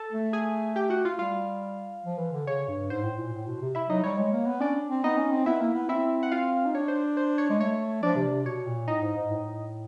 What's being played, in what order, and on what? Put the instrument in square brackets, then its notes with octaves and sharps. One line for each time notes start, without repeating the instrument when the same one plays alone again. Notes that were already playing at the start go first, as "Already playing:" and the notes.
Already playing: [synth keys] A4 A5
[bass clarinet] A3
[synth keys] G#4 G#5
G4 G5
F#4 F#5
F4 F5
[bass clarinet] G3 [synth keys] F4 F5
[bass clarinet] F3
E3
D3
[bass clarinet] C#3 [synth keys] C#5
[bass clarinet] G2
[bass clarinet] G#2 [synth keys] C5
[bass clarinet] A2
A#2
A2
B2
C3
[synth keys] E4 E5
[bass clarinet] F#3 [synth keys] D#4 D#5
[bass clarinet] G3 [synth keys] C#5
[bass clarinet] G#3
A#3
B3
[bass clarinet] C#4 [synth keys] D4 D5
[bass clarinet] C4
[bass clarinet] B3 [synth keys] D#4 D#5
[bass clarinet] C#4
C4
[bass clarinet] B3 [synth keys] E4 E5
[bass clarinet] A#3
B3
[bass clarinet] C4 [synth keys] E4 E5
[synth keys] F#5
F4 F5
[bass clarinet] D#4
[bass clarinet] D4 [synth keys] C#5
[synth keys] C5
C5
C#5
[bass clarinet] G#3
[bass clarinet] A3 [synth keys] C#5
[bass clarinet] F3 [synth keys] D4 D5
[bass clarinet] C3
C3
[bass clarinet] B2 [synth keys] C#5
[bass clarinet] A#2
[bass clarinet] A2 [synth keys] D#4 D#5
[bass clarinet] G#2
G#2
A2